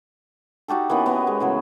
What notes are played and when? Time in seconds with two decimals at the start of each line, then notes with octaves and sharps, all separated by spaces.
0.68 D#4 F#4 G4 A4
0.90 E3 A#3 B3 C#4
1.06 B3 D#5
1.27 G#3
1.40 A2 C#3 F#3